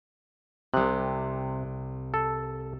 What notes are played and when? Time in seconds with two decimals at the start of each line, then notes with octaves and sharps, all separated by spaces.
0.74 C2 C3 D#6 F#6
2.14 A4